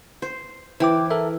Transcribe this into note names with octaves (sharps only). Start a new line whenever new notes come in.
C5
E3 C5 G5 D6
A4 A#4 E5